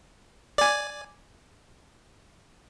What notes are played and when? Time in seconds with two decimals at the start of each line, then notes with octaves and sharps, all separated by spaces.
0.58 D5 G#5